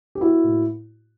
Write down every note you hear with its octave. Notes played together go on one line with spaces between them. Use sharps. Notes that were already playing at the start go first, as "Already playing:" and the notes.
G4
A#3 E4 F#4
A2